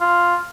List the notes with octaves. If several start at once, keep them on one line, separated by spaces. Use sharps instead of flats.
F4